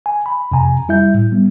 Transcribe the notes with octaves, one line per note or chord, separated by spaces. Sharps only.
G#5
B5
F2 C3 G#5 A#5
G3 E4 E5 G6
A2
G3 B3